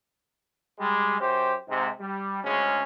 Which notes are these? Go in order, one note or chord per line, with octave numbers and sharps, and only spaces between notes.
G3 G#3
F#2 G4 C5
G#2 C3
G3
D2 C#3 G#3 C#4